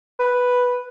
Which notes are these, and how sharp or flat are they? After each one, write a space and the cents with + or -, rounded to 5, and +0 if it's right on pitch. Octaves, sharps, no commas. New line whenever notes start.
B4 +0